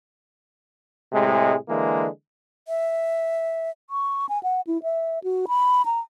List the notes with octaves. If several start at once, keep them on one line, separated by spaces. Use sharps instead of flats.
A2 C3 G#3
D3 E3 G#3 A#3
E5
C#6
G#5
F#5
E4
E5
F#4
B5
A#5